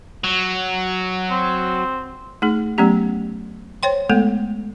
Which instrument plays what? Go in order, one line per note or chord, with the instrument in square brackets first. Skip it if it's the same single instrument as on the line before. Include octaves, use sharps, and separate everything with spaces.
[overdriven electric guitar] F#3
[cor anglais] C4
[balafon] A3 D#4 G#4
F#3 A3 B3 C#4 G4
C5 C#5 G5 C6
G#3 A3 B3 A4